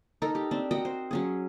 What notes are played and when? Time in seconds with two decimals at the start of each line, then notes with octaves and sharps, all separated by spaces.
0.22 D#4 A4 A#4
0.35 G4
0.51 C4 D4
0.71 F#4 A#4 D#5 G5
0.85 C5
1.11 F#3 C#4 G#4